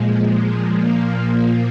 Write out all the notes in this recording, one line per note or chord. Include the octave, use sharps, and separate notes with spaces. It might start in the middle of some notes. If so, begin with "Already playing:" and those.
Already playing: A#2 F3 G#3
G#3
A#2 F3 A#3